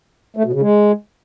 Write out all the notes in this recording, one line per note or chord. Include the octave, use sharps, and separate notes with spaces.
A3
B2
C#3
G#3